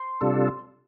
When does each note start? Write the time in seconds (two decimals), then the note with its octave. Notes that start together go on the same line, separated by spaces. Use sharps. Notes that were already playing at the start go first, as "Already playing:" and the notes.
Already playing: C5 C6
0.21 C3 G3 D4 F4 A4